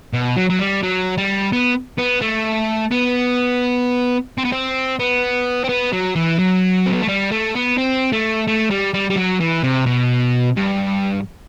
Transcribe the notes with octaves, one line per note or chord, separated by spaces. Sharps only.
B2
F#3
F#3
G3
F#3
G3
B3
B3
A3
B3
C4
B3
C4
B3
C4
B3
F#3
E3
F#3
C4
B3
A3
G3
A3
B3
C4
A3
A3
G3
G3
G3
F#3
E3
C3
B2
G2